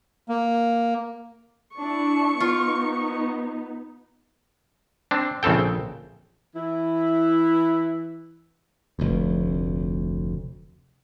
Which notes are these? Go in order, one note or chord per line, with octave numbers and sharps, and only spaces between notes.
A#3
D4 E4 C#6
B3 D#4 F4
C4 D4
A#1 C#3 C4 A4 G5
E3 E4
F1 D2